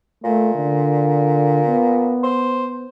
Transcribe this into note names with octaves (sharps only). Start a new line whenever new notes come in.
A#2 A3
D3
B3
C5